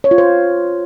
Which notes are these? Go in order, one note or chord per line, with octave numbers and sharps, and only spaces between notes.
C#5
F4
C5